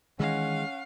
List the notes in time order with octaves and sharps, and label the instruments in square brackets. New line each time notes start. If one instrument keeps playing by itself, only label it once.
[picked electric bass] D#3 E3 [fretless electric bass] G#3 [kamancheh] C#4 F#5 [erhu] F5